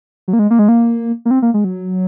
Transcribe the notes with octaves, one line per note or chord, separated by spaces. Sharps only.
F#3
A#3
G#3
A#3
G#3
A#3
A#3
C4
A#3
G#3
F#3